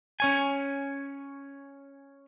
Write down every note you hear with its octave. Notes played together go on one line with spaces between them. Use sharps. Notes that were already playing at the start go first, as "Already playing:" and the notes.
C#4 C#5 G#5